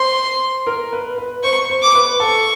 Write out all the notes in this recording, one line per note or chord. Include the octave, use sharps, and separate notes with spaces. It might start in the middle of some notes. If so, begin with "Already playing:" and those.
Already playing: C5 C6
A#4
B4
B4
C5 C#6
C5
D6
B4
A4 C#6